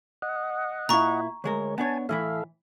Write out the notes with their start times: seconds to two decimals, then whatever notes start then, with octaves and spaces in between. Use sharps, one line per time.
0.22 D#5 F#5
0.89 A#2 E4 A#5 C#6
1.44 D2 G#3 A#4 C#5
1.78 B3 D4 C#5 G#5 A5
2.09 A2 E3 E4 A4 E5 F5